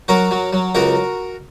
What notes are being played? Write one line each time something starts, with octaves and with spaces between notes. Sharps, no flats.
F#3 F#4 A#4
F#3
F#3
C#2 F#4 A#4